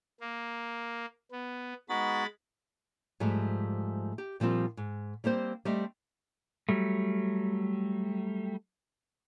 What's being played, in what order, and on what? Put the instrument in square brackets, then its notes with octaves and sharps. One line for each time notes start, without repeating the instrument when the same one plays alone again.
[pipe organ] A#3
B3
[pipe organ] G#3 B5 A6 [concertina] B3 D#4 F#4
[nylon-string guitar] G#2 F3 G3 A3
G4
A#2 F3 G3 C4 F4
G#2
G3 A#3 C4 C5
G3 A3 C4 D#5
[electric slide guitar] F#3 G3 A3